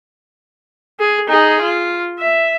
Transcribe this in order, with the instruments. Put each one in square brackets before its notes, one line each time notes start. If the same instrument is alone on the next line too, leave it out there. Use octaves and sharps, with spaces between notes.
[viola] G#4
D#4 G#4
F4
E5